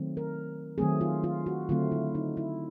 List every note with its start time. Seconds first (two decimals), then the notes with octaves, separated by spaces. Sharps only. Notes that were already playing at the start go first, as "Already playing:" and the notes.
Already playing: D#3 F#3 A3 C4
0.17 A#4
0.78 D#3 F#3 A3 C4 G#4
1.01 F4
1.24 F4
1.46 F#4
1.69 D3 F#3 A3 C4 F4
1.92 E4
2.15 D#4
2.37 E4